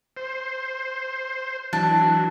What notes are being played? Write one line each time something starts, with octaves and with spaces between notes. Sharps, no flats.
C5
E3 F#3 D4